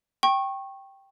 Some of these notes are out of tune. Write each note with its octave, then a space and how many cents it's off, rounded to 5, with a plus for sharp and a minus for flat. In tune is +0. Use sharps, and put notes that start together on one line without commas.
G5 -5 C#6 -25